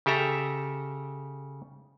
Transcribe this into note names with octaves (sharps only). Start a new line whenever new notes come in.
C#3 G4 A4 E5 A#5